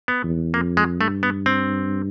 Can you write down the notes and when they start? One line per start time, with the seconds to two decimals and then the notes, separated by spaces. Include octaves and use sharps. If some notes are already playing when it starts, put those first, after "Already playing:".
0.08 B3
0.23 E2
0.54 F2 A#3
0.77 G#3
1.00 G2 A3
1.23 B3
1.46 C4